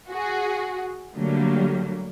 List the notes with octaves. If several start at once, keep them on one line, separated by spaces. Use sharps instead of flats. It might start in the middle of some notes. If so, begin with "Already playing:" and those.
F#4 G#4
D3 F#3 G3 A3 A#3